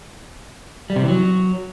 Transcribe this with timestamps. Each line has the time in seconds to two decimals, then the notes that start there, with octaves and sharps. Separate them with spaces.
0.90 G3
0.96 C3
1.02 E3
1.08 F#3